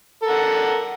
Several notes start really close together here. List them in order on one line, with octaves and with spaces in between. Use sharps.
A4 A#4 F#5